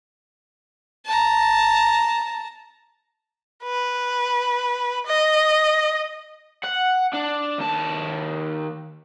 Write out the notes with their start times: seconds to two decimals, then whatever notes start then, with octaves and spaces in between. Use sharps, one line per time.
1.06 A5 A#5
3.63 B4
5.06 D#5
6.64 F#5
7.13 D4
7.58 D#2 A5